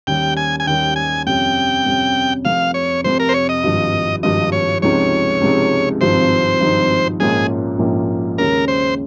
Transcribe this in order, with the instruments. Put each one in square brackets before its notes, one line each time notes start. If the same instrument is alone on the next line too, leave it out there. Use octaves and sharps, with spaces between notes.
[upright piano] D#2 D#3 G3 C#4 [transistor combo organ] G5
[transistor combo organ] G#5
G#5
[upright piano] D#2 D#3 G3 C#4 [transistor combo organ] G5
[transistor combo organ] G#5
[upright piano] F2 C3 G3 C#4 [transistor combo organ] G5
[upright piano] F2 C3 G3 C#4
[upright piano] F1 F2 C3 [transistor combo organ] F5
[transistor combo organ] C#5
[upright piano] F1 F2 C3 [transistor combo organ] C5
[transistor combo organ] A#4
C5
C#5
D#5
[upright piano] G#1 G2 F3
[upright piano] G#1 G2 F3 [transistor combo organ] D#5
[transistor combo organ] C#5
[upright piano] C#2 C3 F3 G#3 D#4 [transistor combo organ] C#5
[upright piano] C#2 C3 F3 G#3 D#4
[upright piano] G#1 G2 F3 C4 D#4 [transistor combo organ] C5
[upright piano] G#1 G2 F3 C4 D#4
[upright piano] A#1 G#2 F3 A#3 C#4 [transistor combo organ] G#4
[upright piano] A#1 G#2 F3 A#3 C#4
[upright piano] D#2 C#3 G#3 C#4 [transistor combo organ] A#4
[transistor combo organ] C5